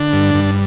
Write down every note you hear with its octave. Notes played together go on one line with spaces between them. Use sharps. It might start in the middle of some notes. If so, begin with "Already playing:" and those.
Already playing: D3 D4
G2
G2